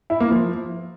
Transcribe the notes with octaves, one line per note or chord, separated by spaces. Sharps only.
E4
A#3
F3